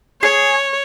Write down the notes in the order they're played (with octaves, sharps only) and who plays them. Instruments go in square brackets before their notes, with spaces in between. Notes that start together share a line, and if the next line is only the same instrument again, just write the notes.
[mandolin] G#4 [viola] C#5